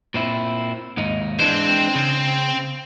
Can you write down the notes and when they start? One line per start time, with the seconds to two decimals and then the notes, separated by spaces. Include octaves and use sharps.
0.14 A#2 C4 E4
0.97 D#2 G#2 D#4
1.39 E3 G#3 C4 D4 C5
1.95 C#3